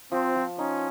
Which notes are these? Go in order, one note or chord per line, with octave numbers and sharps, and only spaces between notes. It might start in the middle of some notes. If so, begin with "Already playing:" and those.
F3 C4
F3
C#4 D#4